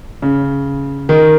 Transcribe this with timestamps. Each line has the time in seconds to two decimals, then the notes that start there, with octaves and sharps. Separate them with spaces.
0.22 C#3
1.09 D#3